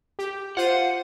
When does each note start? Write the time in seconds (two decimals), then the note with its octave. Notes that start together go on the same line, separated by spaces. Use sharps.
0.19 G4
0.57 F4 C5 F#5 D#7